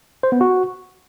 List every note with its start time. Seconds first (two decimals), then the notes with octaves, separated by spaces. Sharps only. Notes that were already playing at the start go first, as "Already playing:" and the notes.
0.23 C5
0.32 B3
0.41 F#4